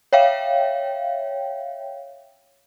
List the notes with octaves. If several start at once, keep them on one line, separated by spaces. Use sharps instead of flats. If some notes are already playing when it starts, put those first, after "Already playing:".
C#5 E5 F5 G5